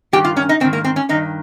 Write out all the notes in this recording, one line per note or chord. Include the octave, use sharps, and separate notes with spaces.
G2 D#3 G4
F4
C#4
D#4
G#2 D#3 C4
A#3
C4
C#4
G2 D#3 D#4